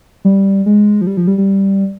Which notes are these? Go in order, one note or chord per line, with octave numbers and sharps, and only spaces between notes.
G3
G#3
F3
G3
F3
G3
G3